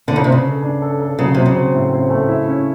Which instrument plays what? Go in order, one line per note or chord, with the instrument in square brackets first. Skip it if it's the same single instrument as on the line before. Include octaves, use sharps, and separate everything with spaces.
[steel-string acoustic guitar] D3 [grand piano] D4
[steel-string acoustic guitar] C#3
[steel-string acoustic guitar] C3 [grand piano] B3
[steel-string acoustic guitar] C#3
[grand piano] A4
D4
A4
A4
[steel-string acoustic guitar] C#3 [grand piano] F#3
[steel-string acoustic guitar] C3 [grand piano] F#3
[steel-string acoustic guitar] C#3
[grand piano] C4
A2
C4
A3
E4
C#4